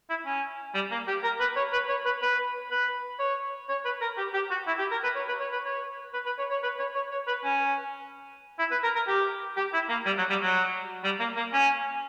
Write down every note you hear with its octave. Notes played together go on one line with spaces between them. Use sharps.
E4
C#4
G3
A#3
G4
A#4
B4
C#5
B4
C#5
B4
B4
B4
C#5
C#5
B4
A#4
G4
G4
F#4
E4
G4
A#4
B4
C#5
B4
C#5
B4
C#5
B4
B4
C#5
C#5
B4
C#5
C#5
C#5
B4
C#4
E4
B4
A#4
A#4
G4
G4
E4
A#3
G3
F#3
G3
F#3
G3
A#3
A#3
C#4